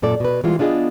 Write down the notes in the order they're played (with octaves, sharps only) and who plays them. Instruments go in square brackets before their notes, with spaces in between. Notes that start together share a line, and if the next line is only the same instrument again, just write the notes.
[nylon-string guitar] F#2 A#2 A4 D5
B2 B4
E3 G3 G#3 B3 F4
B3 D4 F4 G#4 D#5